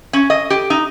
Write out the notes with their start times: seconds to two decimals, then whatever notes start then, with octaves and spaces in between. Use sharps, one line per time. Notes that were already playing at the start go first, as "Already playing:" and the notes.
0.13 C#4
0.30 D#5
0.50 G4
0.70 D#4